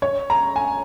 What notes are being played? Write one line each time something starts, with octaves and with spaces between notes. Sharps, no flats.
C#5
A#5
G#5